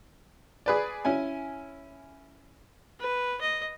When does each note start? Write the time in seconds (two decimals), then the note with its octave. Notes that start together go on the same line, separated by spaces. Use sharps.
0.66 G#4 B4 D5
1.05 C#4 E4 G#5
3.00 B4
3.41 D#5